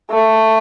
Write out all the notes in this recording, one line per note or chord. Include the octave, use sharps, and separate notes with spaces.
A3